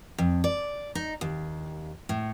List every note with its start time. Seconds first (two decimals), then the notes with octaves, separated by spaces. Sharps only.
0.18 F2
0.44 D5
0.95 D#4
1.21 D#2
2.09 A2